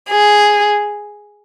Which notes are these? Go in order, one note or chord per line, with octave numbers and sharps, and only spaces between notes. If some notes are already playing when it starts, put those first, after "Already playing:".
G#4